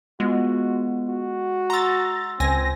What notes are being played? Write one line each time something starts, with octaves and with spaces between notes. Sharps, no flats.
G#3 B3 F4 F#4
F#4
A#5 C6 E6 A6
C#2 C4 G#5 A#6